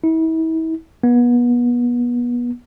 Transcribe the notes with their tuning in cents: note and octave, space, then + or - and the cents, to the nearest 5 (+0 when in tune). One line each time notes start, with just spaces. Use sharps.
E4 -40
B3 -30